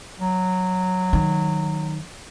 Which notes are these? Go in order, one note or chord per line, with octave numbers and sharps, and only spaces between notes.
F#3
D#3